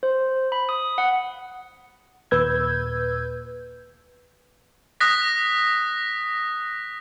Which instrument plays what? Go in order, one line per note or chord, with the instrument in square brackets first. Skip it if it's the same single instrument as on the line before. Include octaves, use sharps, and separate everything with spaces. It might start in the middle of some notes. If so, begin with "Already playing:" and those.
[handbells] C5
B5
D#6
F#5
[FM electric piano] D#2 A#2 B4 E6 G6 G#6
[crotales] D#6 F#6 A#6 B6